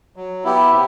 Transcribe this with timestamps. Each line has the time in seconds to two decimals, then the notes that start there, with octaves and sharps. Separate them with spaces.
0.16 F#3
0.44 B3 E4 G4
0.72 C3